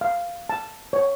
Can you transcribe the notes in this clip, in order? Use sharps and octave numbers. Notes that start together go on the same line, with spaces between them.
F5
A5
C#5